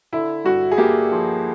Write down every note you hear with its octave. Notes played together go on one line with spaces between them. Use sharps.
D3 E4
G2 F#4
G#4
A#3 G4
F3